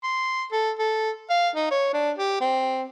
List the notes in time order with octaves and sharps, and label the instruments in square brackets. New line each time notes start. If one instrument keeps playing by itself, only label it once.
[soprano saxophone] C6
A4
A4
F5
D#4
C#5
D4
G4
C4